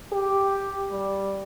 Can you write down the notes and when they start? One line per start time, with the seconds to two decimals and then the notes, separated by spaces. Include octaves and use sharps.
0.13 G4
0.90 G3